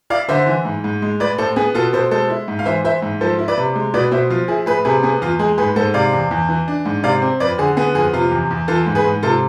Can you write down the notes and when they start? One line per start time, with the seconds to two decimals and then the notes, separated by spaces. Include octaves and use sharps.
0.10 E4 D5 F5
0.29 D3 C5 E5
0.47 E3
0.65 G#2
0.84 G#2
1.02 G#3
1.20 A2 B4 D5
1.38 A2 A4 C5
1.56 B3 G#4
1.75 B2 F4 A4
1.93 B2 A4 C5
2.11 G#3 A4 C5
2.30 E4
2.48 G#2
2.59 F5
2.65 E3 C5 E5
2.84 E4 C5 E5
3.02 G#2
3.21 F3 A4 C5
3.39 E4
3.48 B4 D5
3.58 C3
3.76 G#3
3.94 B2 B4 D5
4.11 B2 C5 E5
4.30 F3 F4
4.48 E4 G#4
4.66 A2 G#4 B4
4.85 C3 G#4 B4
5.03 B3 G#4
5.21 E2 F4
5.39 G#3 G#4
5.58 G#2 G#4 B4
5.76 G#2 A4 C5
5.94 C3 D5 F5
6.13 E2
6.31 E2
6.49 E3
6.68 D4
6.85 G#2
7.03 C3 D5 F5
7.22 C4
7.40 F2 B4 D5
7.58 D3 G#4
7.77 B3 G#4
7.95 F2 G#4
8.13 C3 F4
8.31 E2
8.51 E2
8.68 E3 F4 A4
8.86 G#2
8.95 G#4 B4
9.05 G#2
9.23 C3 F4 A4